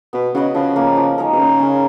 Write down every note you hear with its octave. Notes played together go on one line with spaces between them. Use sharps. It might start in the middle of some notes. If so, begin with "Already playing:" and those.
B2 B3
C#3 F#4 B4 D#5
C#3 F3
A#3 C#4
F3
G#3 D#4 A#4
B2
C#3 A#3
C#4 G#4